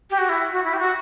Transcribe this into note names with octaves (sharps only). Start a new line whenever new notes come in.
G4
F#4
E4
F#4
E4
G4
F#4